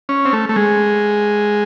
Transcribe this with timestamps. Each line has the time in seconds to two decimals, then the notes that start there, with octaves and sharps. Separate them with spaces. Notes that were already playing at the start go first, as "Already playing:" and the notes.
0.09 C#4
0.25 C4
0.33 A3
0.49 A3
0.56 G#3